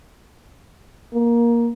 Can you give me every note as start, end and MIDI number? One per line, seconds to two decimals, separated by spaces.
1.13 1.70 58